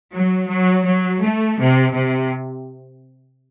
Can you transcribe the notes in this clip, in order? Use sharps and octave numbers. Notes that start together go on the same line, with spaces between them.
F#3
F#3
F#3
A3
C3
C3